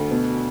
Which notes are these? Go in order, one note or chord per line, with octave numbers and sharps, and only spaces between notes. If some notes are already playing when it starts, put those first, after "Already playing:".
Already playing: D2
B2